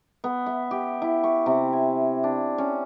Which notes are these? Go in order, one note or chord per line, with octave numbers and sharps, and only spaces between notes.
B3
E5
G4
E4
C#6
C3
G#5
D4
C#4